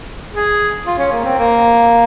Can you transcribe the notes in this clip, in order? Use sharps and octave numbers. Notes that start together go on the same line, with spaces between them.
G#4
F4
C#4
A#3
C4
A#3